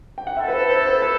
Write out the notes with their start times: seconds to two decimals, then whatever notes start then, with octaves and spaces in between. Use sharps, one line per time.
0.18 G5
0.27 F#5
0.37 C4 E4 A4 E5
0.48 B4
0.53 C5
0.69 C5
0.85 C5
1.02 B4